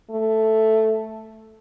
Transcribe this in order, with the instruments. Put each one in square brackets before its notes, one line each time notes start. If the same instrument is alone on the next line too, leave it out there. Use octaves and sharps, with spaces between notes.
[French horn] A3